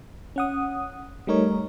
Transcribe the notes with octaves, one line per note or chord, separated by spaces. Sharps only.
C#4 F#5 D#6
G3 A3 D#4 A#4 C#5